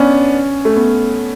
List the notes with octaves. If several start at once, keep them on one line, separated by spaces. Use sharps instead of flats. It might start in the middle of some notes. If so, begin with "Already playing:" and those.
Already playing: B3 C#4 D4
A3
B3